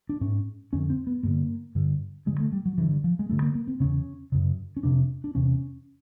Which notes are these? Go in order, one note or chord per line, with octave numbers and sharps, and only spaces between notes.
D4
G#2 C#4
F2 D3 C#4
C4
B3
G2 D3 A#3
G2 D3
G2 D3 G#3
A3
G3
F#3
G2 D3 E3
F3
G#3
G2 D3 A3
A#3
A#3
C4
E2 C#3 C#4
F#2 C#3
C#4
F2 C3 D4
D4
E2 C3 C#4